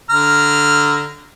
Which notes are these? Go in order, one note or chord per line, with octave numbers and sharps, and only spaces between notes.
D3 A#5 F6